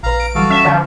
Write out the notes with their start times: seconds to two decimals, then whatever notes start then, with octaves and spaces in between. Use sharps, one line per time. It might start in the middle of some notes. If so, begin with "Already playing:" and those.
0.03 A#1 B4 F5 A#5
0.20 D7
0.35 E3 F#3 G3 F#4 A4 F5
0.50 C#4 E5 A5
0.65 D3 F3